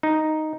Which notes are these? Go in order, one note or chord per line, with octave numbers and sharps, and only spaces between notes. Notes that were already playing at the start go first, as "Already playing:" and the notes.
D#4